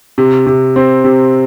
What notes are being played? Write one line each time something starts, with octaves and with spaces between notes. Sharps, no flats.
C3
C3
C4
C3